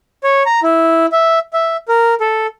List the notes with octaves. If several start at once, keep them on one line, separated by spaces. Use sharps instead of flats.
C#5
A#5
E4
E5
E5
A#4
A4